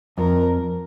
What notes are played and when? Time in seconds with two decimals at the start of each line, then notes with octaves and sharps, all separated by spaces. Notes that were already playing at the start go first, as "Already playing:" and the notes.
0.18 F2 A#4